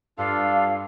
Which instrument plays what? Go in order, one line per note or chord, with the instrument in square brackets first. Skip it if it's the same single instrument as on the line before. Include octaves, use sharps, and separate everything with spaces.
[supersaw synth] G2 [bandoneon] D4 F4 A4 [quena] F5